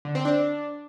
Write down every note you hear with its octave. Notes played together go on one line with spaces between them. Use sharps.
D3
C4
D4